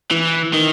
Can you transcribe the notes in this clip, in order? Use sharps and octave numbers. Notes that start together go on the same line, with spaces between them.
E3
D#3